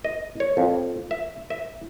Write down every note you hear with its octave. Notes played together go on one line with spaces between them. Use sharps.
D#5
C#5
F2
E5
E5